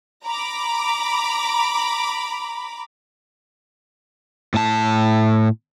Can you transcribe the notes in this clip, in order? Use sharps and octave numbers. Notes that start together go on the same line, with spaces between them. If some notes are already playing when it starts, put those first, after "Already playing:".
A#5 B5 D6
A2 A5